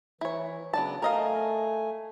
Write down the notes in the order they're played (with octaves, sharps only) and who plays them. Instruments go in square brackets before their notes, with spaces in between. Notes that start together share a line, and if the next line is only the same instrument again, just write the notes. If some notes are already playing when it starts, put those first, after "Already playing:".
[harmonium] E3 [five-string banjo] E4 C#5
[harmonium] C#3 F#3 D4 [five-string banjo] B3 D5 A5
[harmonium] A3 G#5 [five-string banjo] A#4 D#5 F5